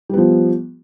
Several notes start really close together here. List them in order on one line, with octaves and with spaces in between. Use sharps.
G3 B3 F3